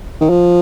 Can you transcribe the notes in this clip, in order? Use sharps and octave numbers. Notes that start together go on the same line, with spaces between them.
D#3
F3